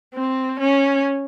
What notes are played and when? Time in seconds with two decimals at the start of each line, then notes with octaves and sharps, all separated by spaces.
0.14 C4
0.59 C#4